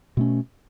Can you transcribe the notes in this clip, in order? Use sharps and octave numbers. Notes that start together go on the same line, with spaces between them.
B2 A3 C#4